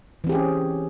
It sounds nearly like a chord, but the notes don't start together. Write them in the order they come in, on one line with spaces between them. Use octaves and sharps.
E3 C4 G4 G#4 C#4